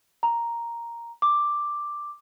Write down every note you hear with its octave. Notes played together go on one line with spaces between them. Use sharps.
A#5
D6